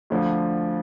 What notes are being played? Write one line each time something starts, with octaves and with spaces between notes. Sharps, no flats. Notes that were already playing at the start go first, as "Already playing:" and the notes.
D2 D3 F3